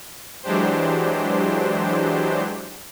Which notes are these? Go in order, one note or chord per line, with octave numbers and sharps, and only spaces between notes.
E3 F#3 G#3 D4 G4 C5